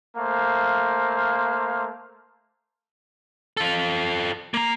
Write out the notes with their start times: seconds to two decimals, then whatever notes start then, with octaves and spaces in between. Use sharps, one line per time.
0.17 A3 A#3 C5 F5
3.57 F4 A4
4.54 A#3 A#5